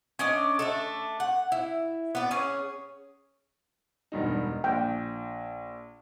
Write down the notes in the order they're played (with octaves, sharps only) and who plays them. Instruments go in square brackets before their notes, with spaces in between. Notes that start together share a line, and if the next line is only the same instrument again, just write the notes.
[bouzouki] C#4 D4 D5 D#5
A3 D4 A4
F#5
E4
B3 D5
C#4 G#4 C#5
[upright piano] E1 G2 D#4
[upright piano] A#1 [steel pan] G5